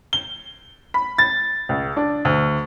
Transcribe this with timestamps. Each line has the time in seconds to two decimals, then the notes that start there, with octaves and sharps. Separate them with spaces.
0.13 G7
0.94 B5
1.18 A6
1.69 C#2
1.97 D4
2.25 D2